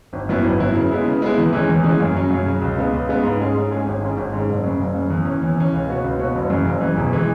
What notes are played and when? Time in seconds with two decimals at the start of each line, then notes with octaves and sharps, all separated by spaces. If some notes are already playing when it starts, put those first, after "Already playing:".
0.13 G#1
0.29 F#2 F#3 B3 E4
0.44 G#1
0.59 F#2 F#3 B3 E4
0.75 C#3
0.91 G#3 B3 E4
1.06 C#3
1.22 G#3 B3 E4
1.37 E2
1.53 E3 G#3 C#4
1.69 E2
1.84 E3 G#3 C#4
2.00 F#2
2.15 C#3 F#3 C#4
2.31 F#2
2.46 C#3 F#3 C#4
2.62 C#2
2.77 C#3 G#3 B3
2.93 C#2
3.09 C#3 G#3 B3
3.23 G#2
3.40 G#3 C#4 G#4
3.55 G#2
3.71 G#3 C#4 G#4
3.86 G#1
4.02 G#2 G#3 C#4
4.17 G#1
4.33 G#2 G#3 C#4
4.49 F#1
4.64 F#2 C#3
4.79 F#1
4.95 F#2 C#3
5.10 E2
5.25 E3 C#4
5.41 E2
5.57 E3 C#4
5.72 C#2
5.88 B2 B3 F#4 C#5
6.04 C#2
6.19 B2 B3 F#4 C#5
6.35 F#1
6.50 F#2 C#3 E3
6.65 F#1
6.81 F#2 C#3 E3
6.97 E1
7.12 E3 G#3